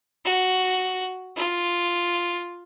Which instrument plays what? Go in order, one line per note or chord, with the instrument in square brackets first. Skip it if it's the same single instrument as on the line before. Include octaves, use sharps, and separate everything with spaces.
[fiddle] F#4
F4